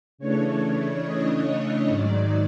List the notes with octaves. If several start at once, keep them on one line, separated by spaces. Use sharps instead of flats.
C#3 E3 A3 D4 C#5
D#5
G#2 D#3 F#3 D5